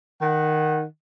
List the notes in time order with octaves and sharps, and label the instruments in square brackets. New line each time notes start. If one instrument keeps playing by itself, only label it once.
[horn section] D#3 F#5